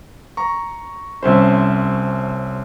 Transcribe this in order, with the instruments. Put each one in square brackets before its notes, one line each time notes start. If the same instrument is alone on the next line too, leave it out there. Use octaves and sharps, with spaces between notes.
[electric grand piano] A#5 C#6
[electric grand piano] C2 C#4 C5 [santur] E5 A5 C6